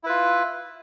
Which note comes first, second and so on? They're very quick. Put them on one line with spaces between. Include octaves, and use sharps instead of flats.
E4 B4 F4